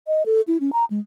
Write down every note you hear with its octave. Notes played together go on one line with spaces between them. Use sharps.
D#5
A4
E4
C#4
A#5
G#3